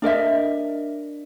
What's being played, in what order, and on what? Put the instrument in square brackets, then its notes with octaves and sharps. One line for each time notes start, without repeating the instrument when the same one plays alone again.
[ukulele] D4 A#4 D#5 E5